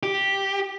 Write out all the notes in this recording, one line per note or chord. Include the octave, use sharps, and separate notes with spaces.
G4